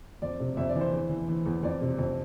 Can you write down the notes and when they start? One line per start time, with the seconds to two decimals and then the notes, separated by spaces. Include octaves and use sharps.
0.22 F2 D5
0.40 C3
0.57 F2 E5
0.69 D5
0.76 E3
0.81 C5
0.93 E2
1.10 E3
1.29 E3
1.46 E2
1.63 F2 D5
1.81 C3
1.98 F2